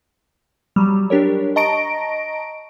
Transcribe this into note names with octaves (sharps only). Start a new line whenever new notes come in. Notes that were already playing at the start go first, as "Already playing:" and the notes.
F#3 G3
D4 G4 A#4 C#5
D#5 A5 A#5 C#6 A#6 D7